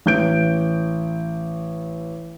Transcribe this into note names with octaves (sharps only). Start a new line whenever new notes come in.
A1 G6 D7